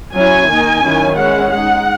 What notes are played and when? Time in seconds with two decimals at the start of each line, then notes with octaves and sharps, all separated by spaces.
0.14 F#3 C#4 E4 G#5
0.49 D#3 A#3 D#4
0.82 D#3 F#3 C#4 E4
1.16 G#3 C#4 E4 F#5
1.50 G#3 D#4 F#5